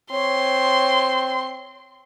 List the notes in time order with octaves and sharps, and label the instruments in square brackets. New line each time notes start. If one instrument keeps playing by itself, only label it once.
[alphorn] C4 [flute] C#5 [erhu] C6